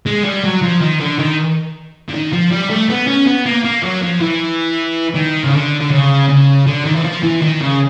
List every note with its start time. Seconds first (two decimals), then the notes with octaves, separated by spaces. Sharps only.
0.06 G#3
0.24 G3
0.43 F#3
0.62 F3
0.81 D#3
1.00 D3
1.19 D#3
2.09 D3
2.14 D#3
2.32 F3
2.51 G3
2.70 A3
2.89 B3
3.07 C#4
3.27 B3
3.46 A#3
3.65 A#3
3.83 F#3
4.03 F3
4.21 E3
5.15 D#3
5.44 C#3
5.53 D3
5.80 D3
5.91 C#3
6.29 C#3
6.66 D3
6.85 D#3
6.95 E3
7.04 F3
7.23 E3
7.42 D#3
7.61 C#3